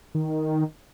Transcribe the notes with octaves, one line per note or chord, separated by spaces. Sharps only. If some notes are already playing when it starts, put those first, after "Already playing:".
D#3